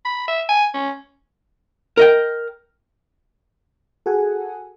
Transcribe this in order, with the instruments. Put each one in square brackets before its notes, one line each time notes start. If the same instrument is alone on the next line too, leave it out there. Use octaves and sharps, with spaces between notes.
[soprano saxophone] B5
E5
G#5
C#4
[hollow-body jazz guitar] A#4 D#5 G5
[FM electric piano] F#4 G#4 A4 F#5 G#5